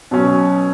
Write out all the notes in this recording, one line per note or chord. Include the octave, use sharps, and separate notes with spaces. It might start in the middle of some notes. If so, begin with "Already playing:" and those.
B2 F#3 C#4